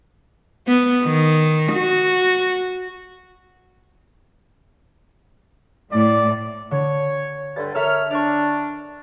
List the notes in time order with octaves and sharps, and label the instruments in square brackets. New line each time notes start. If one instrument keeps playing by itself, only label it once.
[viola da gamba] B3
D#3
F#4
[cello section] A2 [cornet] D5
[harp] D3 [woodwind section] C#5
[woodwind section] G2 D3 [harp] A6
[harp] A4 E5 [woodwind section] A#4 C#5 F6
[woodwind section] D4 [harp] D5 C#6